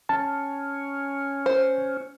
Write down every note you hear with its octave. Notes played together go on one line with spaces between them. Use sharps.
C#4 A5
C5